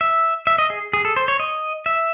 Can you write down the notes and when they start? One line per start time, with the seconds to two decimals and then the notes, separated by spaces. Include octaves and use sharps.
0.01 E5
0.47 E5
0.58 D#5
0.70 G#4
0.93 G#4
1.05 A4
1.16 C5
1.28 C#5
1.40 D#5
1.86 E5